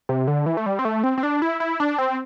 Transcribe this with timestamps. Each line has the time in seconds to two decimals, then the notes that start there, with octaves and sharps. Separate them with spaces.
0.09 C3
0.28 D3
0.46 E3
0.57 A3
0.66 G3
0.79 C4
0.85 A3
1.04 C4
1.18 C4
1.23 D4
1.42 E4
1.60 E4
1.80 D4
1.98 C4